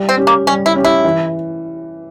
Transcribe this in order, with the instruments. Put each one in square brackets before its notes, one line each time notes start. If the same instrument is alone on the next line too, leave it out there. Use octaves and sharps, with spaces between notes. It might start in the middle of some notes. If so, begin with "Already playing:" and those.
Already playing: [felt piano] G3
[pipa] C4
[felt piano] C#4 G4
[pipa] A#3
[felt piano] G3 [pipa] C#4
[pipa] E4
[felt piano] C#4 G4
[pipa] E4
[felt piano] E3